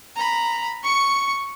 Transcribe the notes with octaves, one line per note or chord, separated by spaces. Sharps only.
A#5 B5
C#6 C#7